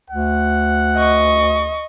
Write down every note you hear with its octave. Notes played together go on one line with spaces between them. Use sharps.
D2 F#5
D#5 C#6